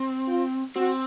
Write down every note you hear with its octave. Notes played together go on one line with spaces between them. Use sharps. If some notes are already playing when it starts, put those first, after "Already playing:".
Already playing: C4
F4
C4 F#4